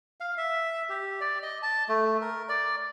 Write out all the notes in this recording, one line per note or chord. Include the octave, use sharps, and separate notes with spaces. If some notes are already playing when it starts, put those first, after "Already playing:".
F5
E5
G4
D5
D#5
A5
A3
A#4
D5